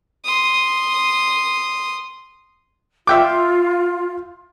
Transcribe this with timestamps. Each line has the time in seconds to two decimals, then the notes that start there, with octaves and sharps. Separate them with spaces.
0.24 C6 D#6
3.07 F4 E5 G5 D6